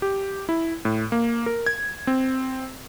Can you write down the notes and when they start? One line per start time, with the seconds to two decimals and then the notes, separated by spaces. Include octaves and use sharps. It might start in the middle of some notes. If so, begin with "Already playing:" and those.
0.02 G4
0.49 E4
0.85 A2
1.12 A#3
1.46 A#4
1.66 G#6
2.07 C4